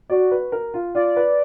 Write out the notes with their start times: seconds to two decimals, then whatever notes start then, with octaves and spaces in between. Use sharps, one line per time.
0.10 F#4 D5
0.31 B4
0.52 A#4
0.74 F4
0.95 F4 D5
1.16 B4